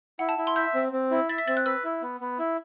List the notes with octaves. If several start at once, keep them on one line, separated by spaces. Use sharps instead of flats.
E4 F#5
A5
E4
C6
E5 G6
C4
C4
E4
E5 A6
B6
C4 A6
F#6
B4 E6
E4
B3
B3
E4